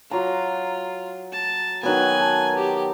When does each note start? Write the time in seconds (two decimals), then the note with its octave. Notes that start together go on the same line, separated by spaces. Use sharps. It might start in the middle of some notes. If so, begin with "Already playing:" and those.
0.11 F#3 F4 A#5
1.32 A5
1.83 D#3 F#3 B3 B4 G#5
2.21 A5
2.56 G4